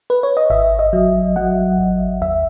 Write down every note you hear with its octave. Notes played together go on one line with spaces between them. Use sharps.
B4
C#5
D#5
G#1 E5
D#5
F#3
F#3 F#5
G#1
D#2 E5